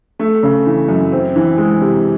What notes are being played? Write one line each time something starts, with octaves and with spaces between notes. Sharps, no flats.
A3
C#3
E3
F#2
C4
E3
G#3
C3